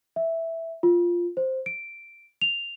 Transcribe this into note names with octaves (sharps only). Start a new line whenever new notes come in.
E5
F4
C5
D7
F7